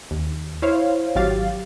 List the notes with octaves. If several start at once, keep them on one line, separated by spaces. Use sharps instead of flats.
D#2
E4 C5 C#5 F5
G#1 F#3 G4 F5 A6